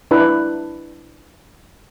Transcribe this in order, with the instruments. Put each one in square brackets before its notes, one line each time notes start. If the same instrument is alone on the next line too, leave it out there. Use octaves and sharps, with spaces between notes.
[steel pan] D4 E4 B4 D5